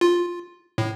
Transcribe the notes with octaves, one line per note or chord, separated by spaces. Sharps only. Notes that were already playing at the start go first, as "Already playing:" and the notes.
F4
A2